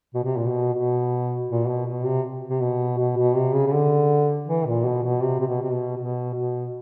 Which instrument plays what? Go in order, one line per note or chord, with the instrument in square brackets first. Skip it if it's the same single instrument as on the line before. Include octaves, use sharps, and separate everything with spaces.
[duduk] B2
C3
A#2
B2
B2
A#2
B2
B2
C3
C3
B2
B2
B2
C3
C#3
C#3
D3
E3
A#2
B2
B2
C3
C3
B2
C3
B2
B2
B2